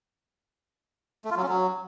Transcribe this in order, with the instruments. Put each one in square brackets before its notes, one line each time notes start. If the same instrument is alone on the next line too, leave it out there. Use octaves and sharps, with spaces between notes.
[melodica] A3
F4
F#3
C#4
F#3